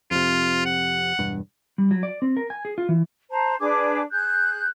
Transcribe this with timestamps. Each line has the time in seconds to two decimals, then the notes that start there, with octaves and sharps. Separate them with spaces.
0.11 F2 C3 F4
0.65 F#5
1.19 E1 G2
1.78 G3
1.91 F#3
2.03 D5
2.22 C4
2.37 A#4
2.50 G#5
2.65 G#4
2.78 F4
2.89 E3
3.30 C5 A5 A#5
3.60 D4 G#4 B4 D6
4.11 G#4 F#6 G6